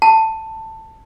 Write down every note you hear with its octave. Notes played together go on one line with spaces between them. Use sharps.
A5